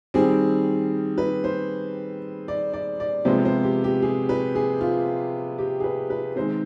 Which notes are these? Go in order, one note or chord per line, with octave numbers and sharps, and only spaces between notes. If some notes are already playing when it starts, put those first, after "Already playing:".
D#3 G3 C4 G#4
B4
C5
D5
D5
D5
C3 F3 G#3 B3 C5
C5
G4
G4
G#4
B4
G#4
F4
G4
G#4
B4
B4
D#3 G#3 C4 C5